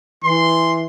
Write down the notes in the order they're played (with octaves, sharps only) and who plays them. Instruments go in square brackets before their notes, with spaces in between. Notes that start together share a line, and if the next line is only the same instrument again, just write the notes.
[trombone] E3 [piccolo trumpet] C6